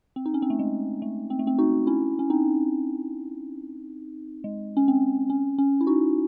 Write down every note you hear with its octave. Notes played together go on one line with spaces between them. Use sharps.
C4
D#4
C#4
C4
A3
G#3
A3
C4
A3
C4
D#4 F#4
C#4 E4
C#4
C4 D#4
G#3
C#4
C4
C#4
C#4
E4
D#4 F#4